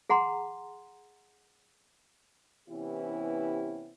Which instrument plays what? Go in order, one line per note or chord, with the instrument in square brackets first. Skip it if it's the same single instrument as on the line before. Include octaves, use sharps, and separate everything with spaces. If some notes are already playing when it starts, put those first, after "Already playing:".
[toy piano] G#4 F#5 A#5 C6
[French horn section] C3 E3 B3 C#4 E4 G4